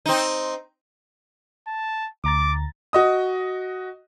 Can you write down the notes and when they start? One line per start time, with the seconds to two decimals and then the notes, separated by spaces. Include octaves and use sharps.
0.06 C4 D#4
1.67 A5
2.24 D2 A#5 D6 A6
2.93 F#4 D#5 D#6